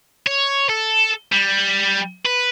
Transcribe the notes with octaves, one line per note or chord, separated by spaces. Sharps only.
C#5
A4
G3
B4